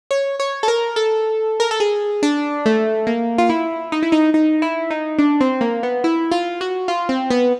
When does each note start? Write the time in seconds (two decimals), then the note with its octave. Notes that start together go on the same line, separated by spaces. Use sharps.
0.11 C#5
0.40 C#5
0.63 A4
0.68 A#4
0.96 A4
1.60 A#4
1.71 A4
1.80 G#4
2.23 D4
2.66 A3
3.07 A#3
3.38 F4
3.50 E4
3.92 D#4
4.03 E4
4.12 D#4
4.34 D#4
4.62 E4
4.90 D#4
5.18 D4
5.41 C4
5.61 A#3
5.83 B3
6.04 E4
6.31 F4
6.61 F#4
6.88 F4
7.09 C4
7.30 B3